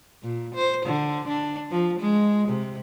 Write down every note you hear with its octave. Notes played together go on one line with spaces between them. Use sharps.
A#2
C5
D3
D4
F3
G#3
C3